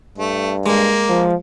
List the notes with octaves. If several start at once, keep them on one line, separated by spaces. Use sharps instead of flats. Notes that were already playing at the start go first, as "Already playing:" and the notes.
G2 A3
G#3 A#3
F3